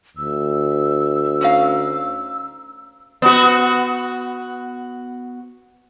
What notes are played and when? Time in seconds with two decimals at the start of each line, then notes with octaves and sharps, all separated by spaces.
0.17 D2 E6
1.41 C#4 D#4 F5
3.22 B3 F#4